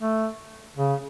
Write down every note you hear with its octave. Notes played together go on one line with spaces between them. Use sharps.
A3
C#3